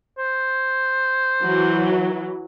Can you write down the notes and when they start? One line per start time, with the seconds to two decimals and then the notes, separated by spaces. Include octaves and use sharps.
0.18 C5
1.41 E3 F#3